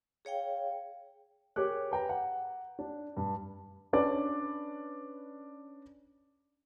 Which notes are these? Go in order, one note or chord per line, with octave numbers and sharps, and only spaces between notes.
G#4 C#5 F5 G5
G4 G#4 A#4 C#5 D6 F#6
B4 G5 A#5
F#5
D4
G2
C#4 D4 B4 D5